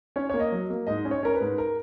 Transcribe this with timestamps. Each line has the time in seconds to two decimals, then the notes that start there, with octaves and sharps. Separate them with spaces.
0.16 C#4 C#5
0.30 A#3 C#5
0.40 D#5
0.52 F#3
0.70 A#3
0.87 G#2 D#5
1.05 C#4
1.11 C#5
1.23 C#4 A#4
1.35 B4
1.40 G#2
1.58 A#4